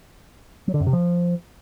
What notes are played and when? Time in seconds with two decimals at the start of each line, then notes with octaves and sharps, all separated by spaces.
0.68 F#3
0.74 D3
0.80 F#2
0.87 C3
0.93 F3